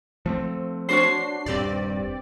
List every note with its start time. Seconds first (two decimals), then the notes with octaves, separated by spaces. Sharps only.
0.26 F3 A3 C4
0.89 D4 F#4 C5 C#5 C7
1.46 D#1 G2 C4 G4 D5